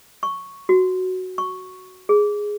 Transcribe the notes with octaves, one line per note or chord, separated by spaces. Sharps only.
C#6
F#4
C#6
G#4